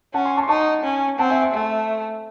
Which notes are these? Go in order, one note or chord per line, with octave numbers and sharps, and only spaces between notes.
C#4 F#5 A5
G#5 C6
A5 C#6
C6
D#4 A5 C#6
C#4
C4 F#5 A5
E5 G#5
G#5 C6
A3